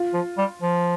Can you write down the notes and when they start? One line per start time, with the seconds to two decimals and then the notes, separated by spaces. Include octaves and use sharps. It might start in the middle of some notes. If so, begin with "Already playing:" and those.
Already playing: F4
0.13 F3
0.37 G3
0.62 F3